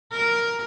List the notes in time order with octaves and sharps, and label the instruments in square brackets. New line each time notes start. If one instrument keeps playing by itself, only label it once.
[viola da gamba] A#4